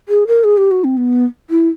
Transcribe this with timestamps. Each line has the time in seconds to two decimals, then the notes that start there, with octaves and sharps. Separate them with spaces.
0.09 G#4
0.27 A#4
0.44 G#4
0.57 G4
0.71 F#4
0.84 C4
0.97 B3
1.50 E4